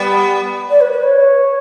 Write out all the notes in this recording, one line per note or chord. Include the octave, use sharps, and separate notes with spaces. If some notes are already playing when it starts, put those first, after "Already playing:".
Already playing: G3 B3
D5
B4
B4
C#5